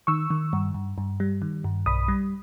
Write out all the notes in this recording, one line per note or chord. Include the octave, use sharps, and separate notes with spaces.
D#3 C#6 E6
D#3
G2
G2
G2
G3
D#3
G2
B1 B5 D#6
G3